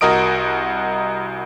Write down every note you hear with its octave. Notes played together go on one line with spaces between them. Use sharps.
C2 F#4 A#4 D#5 D#6 D7